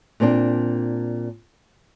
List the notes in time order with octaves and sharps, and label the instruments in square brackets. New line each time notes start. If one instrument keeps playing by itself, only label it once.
[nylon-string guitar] A#2 C4 D4